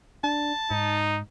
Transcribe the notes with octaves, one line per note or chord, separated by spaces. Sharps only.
D4 A5
G#2 D#4